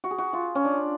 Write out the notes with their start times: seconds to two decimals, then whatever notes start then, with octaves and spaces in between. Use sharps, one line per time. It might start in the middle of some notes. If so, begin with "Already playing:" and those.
0.04 F#4
0.11 G#4
0.18 F#4
0.33 F4
0.55 C#4
0.65 D4